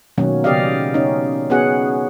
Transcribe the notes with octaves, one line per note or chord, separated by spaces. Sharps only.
B2 D#3 F#3 A#3 C#4
C#3 B3 G4 D5 D#5 F5
C#4 D#4
B3 C#4 F#4 G#4 F#5